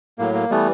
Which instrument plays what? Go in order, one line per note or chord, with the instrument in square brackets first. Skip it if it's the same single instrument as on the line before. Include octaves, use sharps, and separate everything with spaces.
[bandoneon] A2 F#3 A#3
A#3
E3 G3 A3 B3